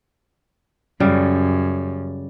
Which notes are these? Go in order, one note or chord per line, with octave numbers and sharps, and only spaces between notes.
F#2 C#3 G3